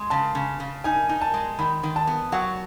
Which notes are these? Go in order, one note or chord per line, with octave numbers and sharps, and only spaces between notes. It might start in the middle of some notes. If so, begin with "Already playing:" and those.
Already playing: G#3
C#3 A5
C#3
C#3
D#4 G#5
D#4
A5
G#3
D#3 B5
D#3
A5
B3
F#3 F#5